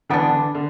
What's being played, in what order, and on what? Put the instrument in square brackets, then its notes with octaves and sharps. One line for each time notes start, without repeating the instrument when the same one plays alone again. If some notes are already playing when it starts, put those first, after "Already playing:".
[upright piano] D3 E3 [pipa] G3 B3 D4
[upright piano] D3
D3